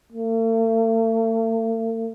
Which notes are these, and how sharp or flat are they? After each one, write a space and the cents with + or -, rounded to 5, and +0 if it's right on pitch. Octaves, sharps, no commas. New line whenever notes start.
A3 +45